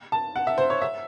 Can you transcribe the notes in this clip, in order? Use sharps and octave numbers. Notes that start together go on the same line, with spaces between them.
A5
F#5
E5
C5
C#5
E5